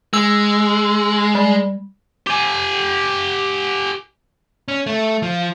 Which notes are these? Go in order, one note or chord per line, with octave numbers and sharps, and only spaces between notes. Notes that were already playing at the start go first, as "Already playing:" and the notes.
G#3 E6
G3
G4 G#5
C#4
A3
F3